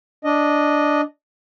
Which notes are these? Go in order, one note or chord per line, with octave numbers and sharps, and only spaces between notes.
D4 D#5